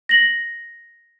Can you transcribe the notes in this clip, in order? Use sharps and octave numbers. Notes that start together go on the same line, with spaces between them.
A#6 F#7